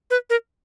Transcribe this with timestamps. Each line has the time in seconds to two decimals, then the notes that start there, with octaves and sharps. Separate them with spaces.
0.10 B4
0.30 A#4